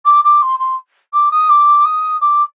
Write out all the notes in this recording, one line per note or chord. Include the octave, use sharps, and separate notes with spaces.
D6
D6
C6
C6
D6
D#6
D6
D#6
D6